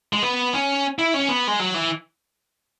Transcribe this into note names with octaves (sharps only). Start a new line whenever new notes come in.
G#3
B3
C#4
E4
C#4
B3
G#3
F#3
E3